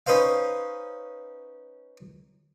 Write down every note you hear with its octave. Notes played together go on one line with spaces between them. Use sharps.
C#4 D#4 B4 C5 F5